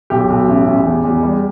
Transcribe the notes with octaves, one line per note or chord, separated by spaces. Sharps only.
B1 G4
B1
A1
A1
E2
E2
G3